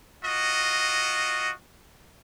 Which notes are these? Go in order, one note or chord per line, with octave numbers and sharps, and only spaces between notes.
F4 F#4 D#5